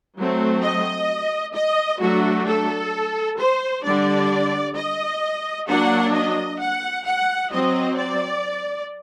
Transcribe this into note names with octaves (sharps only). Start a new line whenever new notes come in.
F#3 A3 C4
D#5
D#5
F#3 A3 D4 F#4
A4
C5
D3 G3 D4 D5
D#5
F#3 A#3 D4 F#5
D#5
F#5
F#5
F#3 C4 D#5
D5